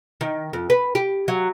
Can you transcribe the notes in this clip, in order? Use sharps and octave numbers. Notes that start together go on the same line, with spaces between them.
D#3
F2
B4
G4
F#3